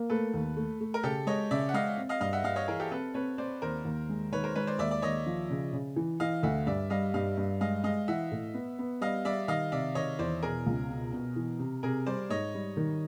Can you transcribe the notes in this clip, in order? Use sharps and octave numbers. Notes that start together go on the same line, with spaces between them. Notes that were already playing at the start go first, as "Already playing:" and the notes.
Already playing: A#3
A3 A4 B4
D#2
A3
A3
A#4
C#3 G4 A4
G#3 C#5 D#5
C#3 D5 E5
F#5
G#3 D#5 F5
C4
D#5 F5
G2 D#5 F5
E5 F#5
G2 D#5 F5
C#5 D#5
E3 G#4 A#4
G4 A4
C4 A4 B4
C4 B4 C#5
C4 C5 D5
D#2 A#4 C5
D#2
G#3
D#3 B4 C#5
A#4 C5
G#3 B4 C#5
C5 D5
D#2 D5 E5
D5
D#2 C#5 D#5
F3
C#3
C#3
E3
E3 D#5 F5
D2 E5 F#5
G2 D5 E5
G3 D#5 F5
G2 D#5 F5
G2
G#3 D#5 F5
G#3 D#5 F5
E3 E5 F#5
A2
B3
B3
G3 D#5 F5
G3 D5 E5
D#3 D#5 F5
C3 D5 E5
D#3 C#5 D#5
E2 C5 D5
B2 G#4 A#4
C#2
B2
B2
E3
C3
C3 G#4 A#4
G3 C5 D5
G#2 C#5 D#5
G3
D#3